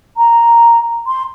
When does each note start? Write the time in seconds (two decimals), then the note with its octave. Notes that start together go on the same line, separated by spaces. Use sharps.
0.17 A#5
1.07 C6